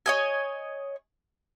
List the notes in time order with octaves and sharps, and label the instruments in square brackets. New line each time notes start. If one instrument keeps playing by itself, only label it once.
[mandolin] C#5 D#5 G#5